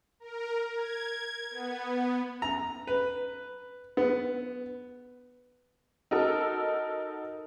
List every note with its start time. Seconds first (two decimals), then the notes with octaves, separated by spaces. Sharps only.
0.20 A#4
0.75 G#6
1.51 B3
2.42 A#5
2.87 B4
3.97 B3
6.11 D#4 F#4 A4 A#4